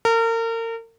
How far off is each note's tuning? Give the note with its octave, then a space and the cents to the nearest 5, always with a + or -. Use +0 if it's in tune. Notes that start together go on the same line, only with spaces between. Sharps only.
A#4 -35